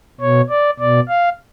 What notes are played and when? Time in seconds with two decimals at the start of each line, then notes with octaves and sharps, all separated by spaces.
0.21 B2 C#5
0.50 D5
0.79 B2 D5
1.09 F5